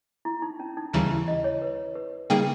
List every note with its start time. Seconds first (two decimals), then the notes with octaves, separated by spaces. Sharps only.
0.25 E4
0.42 D#4
0.60 C#4
0.77 D#4
0.93 D#2 C#3 E3 G3 E4
1.11 E4
1.28 D#5
1.44 C#5
1.62 B4
1.95 B4
2.30 C#3 G3 A#3 D#4 G#4 G5